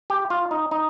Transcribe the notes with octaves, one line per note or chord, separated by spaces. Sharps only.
G4
F4
D#4
D#4